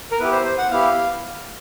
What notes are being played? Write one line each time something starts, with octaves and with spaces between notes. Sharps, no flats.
A#4
B3 E4 G4 B4
C5
C5
F#5
B3 E4 G4 F5